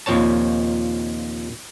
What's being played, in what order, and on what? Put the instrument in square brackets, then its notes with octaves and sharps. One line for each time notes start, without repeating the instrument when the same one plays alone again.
[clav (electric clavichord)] D#2 A#2 F3 C4 C#5 A5